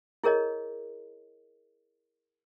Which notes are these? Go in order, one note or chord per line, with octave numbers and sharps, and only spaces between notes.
E4 G#4 A#4 C#5 D#5